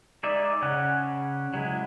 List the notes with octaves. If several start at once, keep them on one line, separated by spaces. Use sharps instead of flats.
G#3 D#4 D5 E5
C#3 C#4 F#5
F#3 G#3 E4